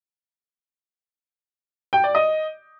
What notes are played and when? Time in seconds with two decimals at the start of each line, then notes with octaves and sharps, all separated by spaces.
1.93 G5
2.04 D5
2.15 D#5